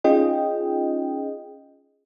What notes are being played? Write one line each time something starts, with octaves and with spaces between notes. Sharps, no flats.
C#4 D#4 F4 G#4 D#5 G5